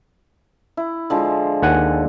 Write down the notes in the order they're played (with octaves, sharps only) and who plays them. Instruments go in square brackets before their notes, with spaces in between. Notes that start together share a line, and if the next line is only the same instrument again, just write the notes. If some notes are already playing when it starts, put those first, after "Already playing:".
[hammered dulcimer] E4
D3 F3 G#3
[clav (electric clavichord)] D#2 F#5 G#5